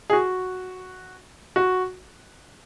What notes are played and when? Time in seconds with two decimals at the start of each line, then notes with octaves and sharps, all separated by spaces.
0.10 G#4
0.13 F#4
1.56 F#4